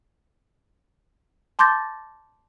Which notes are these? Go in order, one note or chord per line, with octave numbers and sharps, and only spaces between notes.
A5 C6 D6 G6 A6 A#6